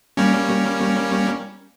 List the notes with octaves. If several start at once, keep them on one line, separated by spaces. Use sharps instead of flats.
G3 A#3 C#4